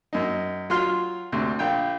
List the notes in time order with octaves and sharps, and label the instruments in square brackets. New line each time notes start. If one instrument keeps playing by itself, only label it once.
[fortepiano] F#2 D#4
F#3 F4 C6 F6
D2 C3
A#1 G5